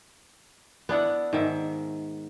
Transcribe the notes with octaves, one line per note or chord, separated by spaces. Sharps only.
B3 D4 E4 F#5
G#2 D#3 E5